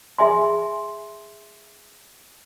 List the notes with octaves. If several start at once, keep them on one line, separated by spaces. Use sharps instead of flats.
G#4 E5 G#5 C6